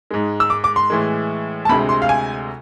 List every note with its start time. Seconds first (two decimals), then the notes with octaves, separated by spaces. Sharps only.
0.11 G#2 G#3
0.40 E6
0.50 D6
0.64 D6
0.76 C6
0.90 A2 E3 G#3
1.65 A5
1.69 D2 C3 G#3 B5
1.89 C6
2.02 F5
2.09 G#5